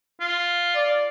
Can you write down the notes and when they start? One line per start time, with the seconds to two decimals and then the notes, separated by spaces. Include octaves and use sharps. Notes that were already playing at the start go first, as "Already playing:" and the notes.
0.20 F4
0.76 D5